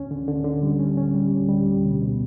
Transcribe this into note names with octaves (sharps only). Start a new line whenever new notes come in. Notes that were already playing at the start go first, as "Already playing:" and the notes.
Already playing: D2 C#4
D3
D3
D3
G3
C#4
C#4
G3
D2
G3
D2
B2
B2